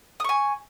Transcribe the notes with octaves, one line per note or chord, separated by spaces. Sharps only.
G#5 C#6 D#6